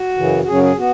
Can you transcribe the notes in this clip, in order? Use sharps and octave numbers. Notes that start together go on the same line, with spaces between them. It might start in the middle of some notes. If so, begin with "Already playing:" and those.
Already playing: F#4
F#2 C#3 E3
F#4
F#2 C#3 F#3 C#4 G#4
G#4
B3 F#4